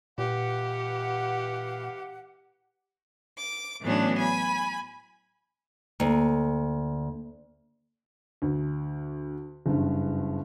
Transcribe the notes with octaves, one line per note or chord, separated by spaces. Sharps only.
A#2 E3 G4 F5 F#5
D6
A2 E3 F#3 B3 C#4 D4
G#5 B5
D2 A#3
D2
F#1 G2